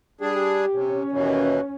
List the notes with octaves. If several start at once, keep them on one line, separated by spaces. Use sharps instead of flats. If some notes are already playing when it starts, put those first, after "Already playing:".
G3 D4 G4 G#4
C3 C#4
D#2 B2 E3 C#5